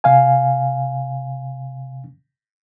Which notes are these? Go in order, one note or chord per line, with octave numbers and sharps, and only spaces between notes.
C3 F5 G#5